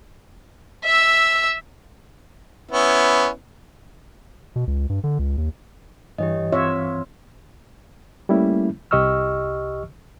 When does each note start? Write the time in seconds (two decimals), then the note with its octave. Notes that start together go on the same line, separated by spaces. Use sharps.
0.85 E5 E6
2.71 B3 C#4 E4
4.56 B2
4.67 C#2
4.89 G2
5.04 D3
5.19 C#2
5.38 D#2
6.18 G2 E3 G4 C#5 D#5
6.52 C4 F4 C#5 E5
8.29 G3 A3 A#3 C#4 E4
8.91 C2 G4 D#5 C#6 E6 F6